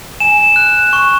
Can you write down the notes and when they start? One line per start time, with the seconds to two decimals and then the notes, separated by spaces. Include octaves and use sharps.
0.20 G#5 E7
0.56 F#6
0.93 C#6